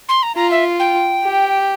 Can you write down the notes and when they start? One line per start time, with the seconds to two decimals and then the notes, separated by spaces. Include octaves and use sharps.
0.08 C6
0.22 A#5
0.36 F4 A#5
0.51 E5
0.79 G5
1.23 G4